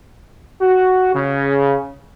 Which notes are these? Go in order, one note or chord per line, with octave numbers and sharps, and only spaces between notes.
F#4
C#3